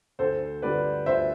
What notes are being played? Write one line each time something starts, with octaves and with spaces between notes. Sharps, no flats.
D2 A4 C5
D3 G3 B4 D5
D2 C5 E5